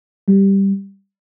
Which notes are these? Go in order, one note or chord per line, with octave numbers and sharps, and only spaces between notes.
G3